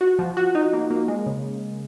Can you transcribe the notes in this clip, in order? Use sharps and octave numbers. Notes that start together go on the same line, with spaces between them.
F#4
F3
F#4
D#4
A#3
A#3
G#3
C#3